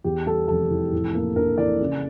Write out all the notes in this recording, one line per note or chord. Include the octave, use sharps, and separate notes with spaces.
E2 G4
G3 A4
F1 A4
E3
A2
A#3
A#1 A#4
E3 D5
C#3